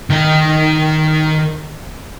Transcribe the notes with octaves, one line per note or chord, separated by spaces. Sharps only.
D#3 D#5